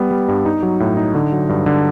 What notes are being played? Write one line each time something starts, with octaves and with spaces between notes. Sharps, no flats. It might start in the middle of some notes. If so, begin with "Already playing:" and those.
Already playing: G3 B3
G3
G2
D#4
F#3
A2
D#4
D3
F#3
G2
D3